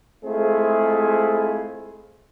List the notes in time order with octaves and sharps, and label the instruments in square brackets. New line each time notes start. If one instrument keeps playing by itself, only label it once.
[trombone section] G#3 A3 C4 E4 F4 G#4